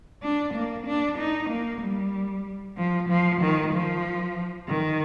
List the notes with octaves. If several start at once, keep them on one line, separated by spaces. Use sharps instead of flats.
D4
A#3
D4
D#4
A#3
G3
F3
F3
D#3
F3
D#3